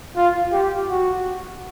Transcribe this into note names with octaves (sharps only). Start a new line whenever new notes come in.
F4
G4
F#4